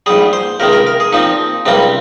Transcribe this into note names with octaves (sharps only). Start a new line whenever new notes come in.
A#1 G#2 G3 G#4
C5
C#2 C3 D#3 G#3 A#4
A#4
A#4
G#4
A#2 F3 C4 D#4
C#2 C3 G3 A#3 C4